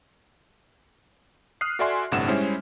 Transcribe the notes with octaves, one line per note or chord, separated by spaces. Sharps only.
D#6 F6 F#6 C7
F#4 A4 D5 E5 G#5 C6
G1 A2 C3 D4 F#5 E7
G3 G#3 C#4 E4 C5